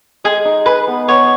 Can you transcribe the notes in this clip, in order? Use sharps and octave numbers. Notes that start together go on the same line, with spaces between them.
G#3 G#4
D#4
G#4 B4
B3
B3 C#5